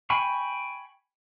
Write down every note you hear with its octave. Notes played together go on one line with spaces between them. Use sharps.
G5 G#5 B5 C#6